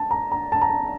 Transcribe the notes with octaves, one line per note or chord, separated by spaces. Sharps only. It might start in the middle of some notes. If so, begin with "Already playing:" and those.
Already playing: A5
A#5
A#5
A5
A#5
A5